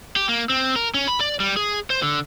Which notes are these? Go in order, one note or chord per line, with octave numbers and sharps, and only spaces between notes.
G4
A#3
C4
A#4
C#4
B5
D5
G3
G#4
C5
D3